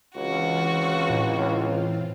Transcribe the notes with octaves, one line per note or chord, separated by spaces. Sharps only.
C#2 E3 C4 F4 F#4
A2